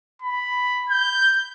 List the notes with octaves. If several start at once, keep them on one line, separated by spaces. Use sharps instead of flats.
B5
G6